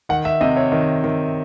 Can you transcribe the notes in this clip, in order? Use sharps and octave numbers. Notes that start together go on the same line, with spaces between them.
D#3 F#5
E5
C3 D#5
C#5
D#3
D#3